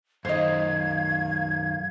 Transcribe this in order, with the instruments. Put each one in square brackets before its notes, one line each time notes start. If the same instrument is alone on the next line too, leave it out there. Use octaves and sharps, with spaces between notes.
[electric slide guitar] F#2 D#3 [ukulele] C5 D#5 [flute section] F5 G#6